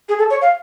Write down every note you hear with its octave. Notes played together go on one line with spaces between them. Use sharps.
G#4
A4
C#5
F5